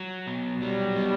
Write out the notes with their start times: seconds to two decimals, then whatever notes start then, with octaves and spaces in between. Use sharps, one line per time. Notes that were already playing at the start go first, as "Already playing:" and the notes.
Already playing: F#3
0.27 B2
0.62 F#3 G3
0.96 B2